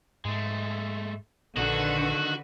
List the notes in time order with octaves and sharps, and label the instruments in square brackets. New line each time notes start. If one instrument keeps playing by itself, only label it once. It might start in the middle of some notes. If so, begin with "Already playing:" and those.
[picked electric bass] G#2 [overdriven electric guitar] G#3 A3
[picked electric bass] A#1 [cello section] D3 B4 [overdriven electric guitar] D#3 A4 [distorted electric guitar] F#4